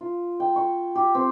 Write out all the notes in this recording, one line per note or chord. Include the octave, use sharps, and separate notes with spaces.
F4
G5
C#6
G4
C4